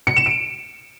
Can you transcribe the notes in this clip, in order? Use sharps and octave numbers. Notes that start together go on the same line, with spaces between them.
C#7
E7
D7